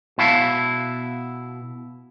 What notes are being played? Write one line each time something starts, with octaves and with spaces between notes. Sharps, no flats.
B2 E4 F5 A5